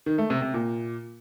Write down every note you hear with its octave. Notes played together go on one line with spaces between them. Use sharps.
D#3
A3
C3
C3
A#2